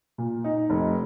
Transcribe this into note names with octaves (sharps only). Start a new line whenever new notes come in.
A#2
D#4
F1